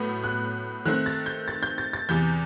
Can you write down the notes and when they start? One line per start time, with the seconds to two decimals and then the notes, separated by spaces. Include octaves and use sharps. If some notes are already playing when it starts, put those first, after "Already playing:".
Already playing: A2 F#3 B3
0.24 F#6
0.85 D#3 A3 C4 F#6
1.06 A6
1.26 G6
1.48 A6
1.63 G6
1.78 A6
1.93 A6
2.09 E2 C3 E3 G6